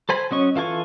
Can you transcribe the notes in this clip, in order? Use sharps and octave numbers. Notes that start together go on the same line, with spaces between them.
A4 C5 G#5 B5
F#3 C#4 D#5 C#6
E3 F4 A4 G#5 C#6